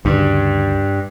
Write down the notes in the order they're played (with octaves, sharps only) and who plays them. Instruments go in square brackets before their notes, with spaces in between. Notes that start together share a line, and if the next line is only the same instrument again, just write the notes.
[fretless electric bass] D2 C#3 [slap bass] G2